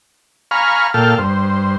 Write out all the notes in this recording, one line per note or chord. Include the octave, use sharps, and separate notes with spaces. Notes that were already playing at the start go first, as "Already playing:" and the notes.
F5 G#5 A#5 B5 C#6 F6
A#2 A4 F5 G5 A5 F6
G2 C5